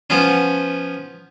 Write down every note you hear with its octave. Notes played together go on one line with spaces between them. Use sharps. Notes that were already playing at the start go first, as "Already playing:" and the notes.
F3 B3 C#4